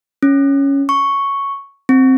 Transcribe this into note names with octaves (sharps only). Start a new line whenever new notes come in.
C#4
C#6
C4